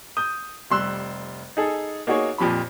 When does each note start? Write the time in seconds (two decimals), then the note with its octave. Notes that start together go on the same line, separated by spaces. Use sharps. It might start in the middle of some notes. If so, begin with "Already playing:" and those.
0.17 D#6 G6
0.71 F1 G3 C6 E6 F#6
1.57 D#4 G#4 A4
2.07 A#3 D#4 F#4 G#4 C#5
2.38 F2 A#2 F3 G4 B5